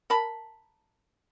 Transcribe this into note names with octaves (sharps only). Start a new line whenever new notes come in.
A#4 A5 B5